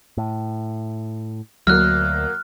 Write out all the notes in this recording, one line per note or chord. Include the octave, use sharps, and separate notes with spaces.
A2
D2 F#3 A#3 F6 F#6